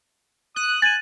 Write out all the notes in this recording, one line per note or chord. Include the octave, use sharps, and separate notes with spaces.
D#6 F#6
G#5 A6 D#7